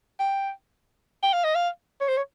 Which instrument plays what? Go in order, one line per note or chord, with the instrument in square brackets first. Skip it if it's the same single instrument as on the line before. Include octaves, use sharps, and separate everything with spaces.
[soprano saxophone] G5
G5
F5
D#5
F5
C#5
C5
C#5